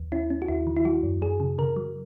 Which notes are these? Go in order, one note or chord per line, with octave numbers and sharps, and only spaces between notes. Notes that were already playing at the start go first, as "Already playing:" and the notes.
Already playing: D#2
C#4 E4
C#4
F#4
D#2 E4
D#3
E4
F#3 F#4
F#2
F#2 G#4
C#3
C#3 A#4
F#3